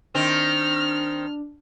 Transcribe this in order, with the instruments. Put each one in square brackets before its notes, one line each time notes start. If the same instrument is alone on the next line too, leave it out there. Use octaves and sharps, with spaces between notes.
[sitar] D#3 C4 [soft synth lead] D4 [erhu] F6